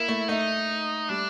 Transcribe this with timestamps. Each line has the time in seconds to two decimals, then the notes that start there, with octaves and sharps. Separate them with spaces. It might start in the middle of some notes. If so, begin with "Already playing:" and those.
Already playing: A#3 E4
0.08 A3
0.28 A3 D#4
1.09 G3 D4